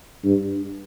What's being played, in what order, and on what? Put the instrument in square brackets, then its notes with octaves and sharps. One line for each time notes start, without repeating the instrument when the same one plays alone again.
[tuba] G2